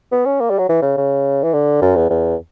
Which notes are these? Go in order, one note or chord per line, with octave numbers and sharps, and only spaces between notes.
B3
C#4
A#3
G3
F#3
E3
C#3
C#3
E3
D3
F#2
E2
E2